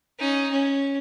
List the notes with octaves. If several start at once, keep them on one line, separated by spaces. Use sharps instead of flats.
C#4 D#4
C#4